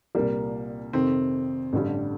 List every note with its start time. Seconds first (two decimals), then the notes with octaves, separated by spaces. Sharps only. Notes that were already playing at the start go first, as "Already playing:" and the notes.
0.15 C2 A#2 G3 A#3
0.93 F2 C3 D#3 C4
1.73 A1 G2 D3 G3